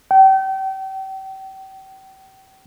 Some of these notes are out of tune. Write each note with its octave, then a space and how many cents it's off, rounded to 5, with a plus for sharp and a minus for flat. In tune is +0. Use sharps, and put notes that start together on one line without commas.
G5 -35